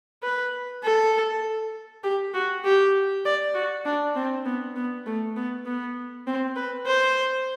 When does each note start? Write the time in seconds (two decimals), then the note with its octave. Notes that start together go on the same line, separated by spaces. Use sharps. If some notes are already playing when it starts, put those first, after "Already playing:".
0.23 B4
0.83 A4
2.04 G4
2.34 F#4
2.64 G4
3.25 D5
3.54 F#4
3.85 D4
4.16 C4
4.45 B3
4.76 B3
5.06 A3
5.36 B3
5.66 B3
6.27 C4
6.56 B4
6.86 C5